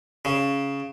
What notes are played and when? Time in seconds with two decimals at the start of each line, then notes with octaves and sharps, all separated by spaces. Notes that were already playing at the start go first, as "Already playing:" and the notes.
0.25 C#3